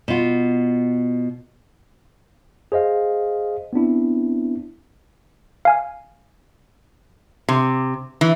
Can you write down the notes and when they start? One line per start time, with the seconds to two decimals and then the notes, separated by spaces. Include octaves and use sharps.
0.08 B2 F4
2.72 G#4 C5 D#5 F5
3.73 B3 C4 D4 E4
5.65 F5 G#5 F6
7.49 C3
8.21 E3